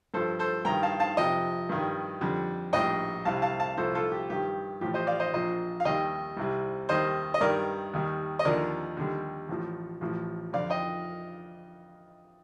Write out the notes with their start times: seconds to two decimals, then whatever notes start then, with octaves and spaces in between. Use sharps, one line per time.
0.14 G2 F3 A4 C5
0.39 A4 C5
0.65 G2 D#3 G3 G5 A#5
0.83 F5 A5
1.00 F5 A5
1.17 F2 C3 F3 D#5 G5
1.69 G2 D#3 G3
2.21 F2 D3 G3
2.73 A#1 A2 G3 D#5 G5
3.25 C2 C3 G3 F5 A5
3.42 F5 A5
3.60 F5 A5
3.77 C2 A#2 F3 A4 C5
3.95 F4 A4
4.12 G4
4.30 G2 D#3 G3 G4
4.81 A1 A2 F3 G4
4.94 C5 D#5
5.07 D5 F5
5.20 C5 D#5
5.33 A#1 A#2 F3 C5 D#5
5.80 F5
5.85 D#2 D#3 G3 D#5 G5
6.37 C2 C3 G3
6.89 D#2 D#3 G3 C5 D#5
7.34 D#5
7.41 G2 D#3 G3 A#4 D5
7.93 D#2 D#3 G3
8.39 D#5
8.45 D#2 D3 F3 A#4 D5
8.97 D#2 D3 G3
9.49 A1 A2 F3
10.01 A1 A2 F3
10.53 F2 D3 F3 D5 F5
10.70 D#5 G5